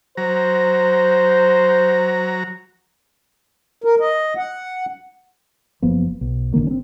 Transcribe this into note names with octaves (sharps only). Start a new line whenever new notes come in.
F#3 C5 A#5
A#4
D#5
F#5
F#1 F3 A#3 B3
B1
G1 D3 D#3 A#3
C4 C#4